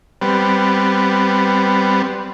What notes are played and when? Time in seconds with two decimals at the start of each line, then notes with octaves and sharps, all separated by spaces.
0.21 G3 B3 C4